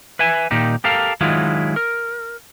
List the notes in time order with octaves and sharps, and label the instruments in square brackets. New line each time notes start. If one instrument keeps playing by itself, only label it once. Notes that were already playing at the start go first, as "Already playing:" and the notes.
[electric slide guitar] B4 E5 G#5
A#2 D#3 D#4 G4
G4 A4 A#4 F5
D#3 F#3 G#3 E4 F4
A#4